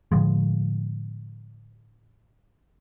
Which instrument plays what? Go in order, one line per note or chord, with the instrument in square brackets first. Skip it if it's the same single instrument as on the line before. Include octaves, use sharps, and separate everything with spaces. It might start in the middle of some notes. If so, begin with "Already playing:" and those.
[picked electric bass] A2 D3 F3 G#3